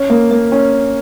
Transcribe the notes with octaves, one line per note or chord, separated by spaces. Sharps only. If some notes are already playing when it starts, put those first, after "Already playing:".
Already playing: C#4
A#3
A#3
C#4